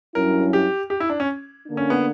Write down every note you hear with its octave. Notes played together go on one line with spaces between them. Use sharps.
G2 F#3 C#4 E4 A#4
G4
G4
E4
D4
C#4
D3 A#3 D4
C#4
B3